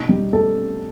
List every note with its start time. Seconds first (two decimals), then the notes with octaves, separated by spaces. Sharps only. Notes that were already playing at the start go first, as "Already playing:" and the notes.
Already playing: B2 A3 D#4
0.09 G3 G4
0.33 A3 A4